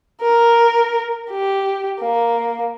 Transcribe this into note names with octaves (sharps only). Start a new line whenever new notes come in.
A#4
G4
A#3